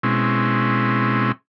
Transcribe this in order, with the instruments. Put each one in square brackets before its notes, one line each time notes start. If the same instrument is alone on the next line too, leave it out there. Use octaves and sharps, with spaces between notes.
[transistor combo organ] B2 G#3 C4 C#4 E4